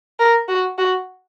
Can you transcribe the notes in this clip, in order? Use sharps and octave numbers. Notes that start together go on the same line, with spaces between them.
A#4
F#4
F#4